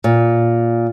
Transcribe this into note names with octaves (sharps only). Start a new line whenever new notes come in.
A#2